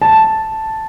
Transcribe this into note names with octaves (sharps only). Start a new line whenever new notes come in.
A5